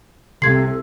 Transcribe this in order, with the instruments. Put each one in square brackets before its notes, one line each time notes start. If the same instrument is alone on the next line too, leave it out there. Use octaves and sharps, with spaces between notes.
[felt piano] C2 C6 [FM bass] C3 [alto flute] A4 [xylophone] G#6 C7